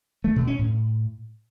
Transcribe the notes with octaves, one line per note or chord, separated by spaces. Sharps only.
A3
B2
C#4
A2